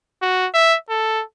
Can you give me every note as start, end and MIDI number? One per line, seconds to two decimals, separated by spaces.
0.22 0.47 66
0.54 0.76 76
0.90 1.23 69